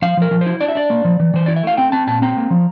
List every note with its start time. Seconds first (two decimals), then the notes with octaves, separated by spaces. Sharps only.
0.02 F3 F5
0.17 F3 A#4
0.31 F3
0.41 C5
0.46 E4
0.61 D4 D5
0.68 E5
0.75 D4 D5
0.90 A#3
1.05 F3
1.20 E3
1.34 E3 C5
1.46 E4 D5
1.56 E5
1.63 A3 F5
1.77 C4 G5
1.92 C4 A5
2.07 A#2 A5
2.22 C4 A#5
2.37 A#3
2.51 F3